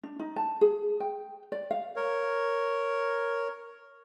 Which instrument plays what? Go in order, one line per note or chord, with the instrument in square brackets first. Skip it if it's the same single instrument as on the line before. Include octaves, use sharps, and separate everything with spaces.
[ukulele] D4
D#4
A5
G#4
G5
D5
F5
[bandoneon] A#4 C#5